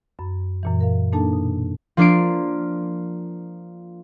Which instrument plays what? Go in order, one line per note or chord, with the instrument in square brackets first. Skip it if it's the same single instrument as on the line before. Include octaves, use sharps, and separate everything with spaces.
[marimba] F#2 B5
F#2 A#2 E3
A#4 F5
A#3 D4 D#4 A4 A5
B2
[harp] F3 A#3 D4 F4 C7 D7